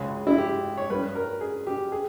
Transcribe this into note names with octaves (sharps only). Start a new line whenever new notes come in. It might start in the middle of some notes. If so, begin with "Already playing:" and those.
Already playing: C#2 C#3 G#3 G#4
E4
G4
C#5
G2 G3 C#4 B4
A#4
G#4
G4
G#4